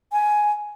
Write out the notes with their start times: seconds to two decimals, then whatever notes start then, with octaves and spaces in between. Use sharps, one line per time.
0.12 G#5